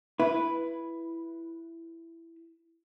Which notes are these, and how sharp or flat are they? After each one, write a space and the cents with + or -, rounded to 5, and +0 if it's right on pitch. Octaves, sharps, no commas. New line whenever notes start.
E4 +10 B4 -5